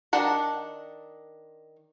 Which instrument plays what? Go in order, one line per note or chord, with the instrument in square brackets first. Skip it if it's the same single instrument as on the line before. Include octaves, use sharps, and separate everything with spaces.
[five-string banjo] D#3 D4 F#5 A#5